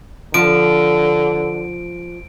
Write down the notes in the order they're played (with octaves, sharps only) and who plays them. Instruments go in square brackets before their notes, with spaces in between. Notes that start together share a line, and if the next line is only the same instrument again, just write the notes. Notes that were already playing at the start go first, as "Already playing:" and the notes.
[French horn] D3 [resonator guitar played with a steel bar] F3 [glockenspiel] D7